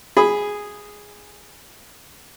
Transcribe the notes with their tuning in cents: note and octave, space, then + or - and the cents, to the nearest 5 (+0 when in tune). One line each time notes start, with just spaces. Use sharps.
G#4 -5 B5 +0